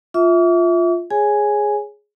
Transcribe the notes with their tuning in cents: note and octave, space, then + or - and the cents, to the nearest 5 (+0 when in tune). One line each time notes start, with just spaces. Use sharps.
F4 +0 E5 -15 D6 -45
G#4 +0 C#5 +0 G#5 +0